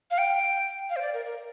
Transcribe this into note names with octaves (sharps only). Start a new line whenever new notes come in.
F5
G5
F5
C5
D5
A#4
A#4